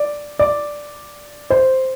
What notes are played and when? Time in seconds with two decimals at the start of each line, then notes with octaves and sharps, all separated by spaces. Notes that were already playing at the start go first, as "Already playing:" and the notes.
Already playing: D5
0.39 D5
1.50 C5